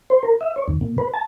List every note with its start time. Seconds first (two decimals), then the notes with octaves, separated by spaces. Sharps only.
0.10 C5
0.23 A#4
0.41 E5
0.56 C#5
0.68 D#2
0.81 A#2
0.98 B4
1.14 A5